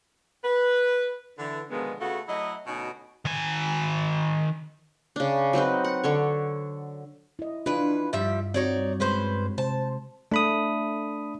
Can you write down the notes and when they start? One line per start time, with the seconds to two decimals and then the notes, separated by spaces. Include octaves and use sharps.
0.43 B4
1.38 D3 E3
1.70 B2 D3 D#3 F3 G#3 B3
1.99 C#3 A3 B3 F4 F#4 A4
2.27 F#3 A3 E4 D#5
2.66 D2 B2 B3 C#4 D#4 F#4
3.25 D#3 G#5
5.16 C#3 D4
5.53 F#3 C4 D#4 B4
5.84 F#5
6.04 D3 A4 C#5
7.39 E4 D#5
7.66 E3 D4 F4 B4
8.13 G2 F3 G3 E5
8.54 C4 D#4 F#4 C#5 D5
9.00 G#3 C#4 B4 C5
9.58 C3 C5 A5
10.31 A3 D4 B5 D#6